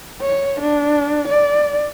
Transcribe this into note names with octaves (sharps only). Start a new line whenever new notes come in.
C#5
D4
D5